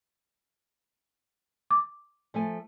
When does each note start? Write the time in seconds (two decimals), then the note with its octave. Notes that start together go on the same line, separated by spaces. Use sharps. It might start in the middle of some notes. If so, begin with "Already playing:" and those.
1.71 D6
2.34 F3 A3 G#5